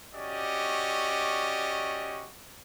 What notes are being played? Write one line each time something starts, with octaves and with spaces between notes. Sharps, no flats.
C#4 F#4 G4 D5 D#5